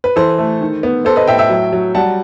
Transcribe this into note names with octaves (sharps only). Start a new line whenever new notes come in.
B4
E3 A4 C5
A3
D#3
B3
B3 A4 C5
B4 D#5
A2 E5 G5
E5 G5
F#3
F#3
G3 F#5 A5